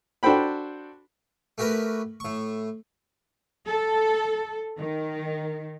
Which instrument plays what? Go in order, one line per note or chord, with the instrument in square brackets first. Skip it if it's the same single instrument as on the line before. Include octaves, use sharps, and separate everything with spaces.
[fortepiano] D4 F#4 A4 C5 G5 B5
[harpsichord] A3 F#4 G4 A#4 B4
A2 C#6
[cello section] A4
D#3